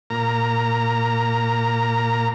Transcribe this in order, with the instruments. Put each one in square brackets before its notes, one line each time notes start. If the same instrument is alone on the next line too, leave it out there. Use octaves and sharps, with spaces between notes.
[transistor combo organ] A#2 A#5